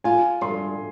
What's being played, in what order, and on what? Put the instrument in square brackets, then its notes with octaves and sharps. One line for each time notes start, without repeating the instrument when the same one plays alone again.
[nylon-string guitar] F4 [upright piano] G#5
[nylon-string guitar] G2 [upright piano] C6